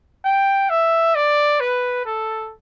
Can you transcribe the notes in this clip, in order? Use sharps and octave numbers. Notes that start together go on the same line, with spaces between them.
G5
E5
D5
B4
A4